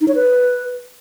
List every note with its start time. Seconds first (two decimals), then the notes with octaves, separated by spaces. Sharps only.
0.01 D#4
0.08 C#5
0.15 B4